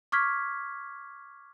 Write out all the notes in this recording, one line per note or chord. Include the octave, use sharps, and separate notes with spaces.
C#6 D6 F6 G#6 B6